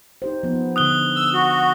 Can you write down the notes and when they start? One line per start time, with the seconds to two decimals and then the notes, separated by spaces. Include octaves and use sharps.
0.22 D#4 G4 C5
0.43 F3 B3
0.76 D3 B3 D#4 D#6 F#6 G7
1.16 E6
1.34 F#4